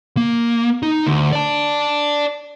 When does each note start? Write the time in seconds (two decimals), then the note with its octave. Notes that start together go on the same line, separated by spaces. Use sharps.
0.17 A#3
0.83 D#4
1.06 D2
1.32 D5 A5